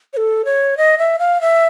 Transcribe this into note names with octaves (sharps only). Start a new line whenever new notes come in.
C#5
A4
C#5
D#5
E5
F5
E5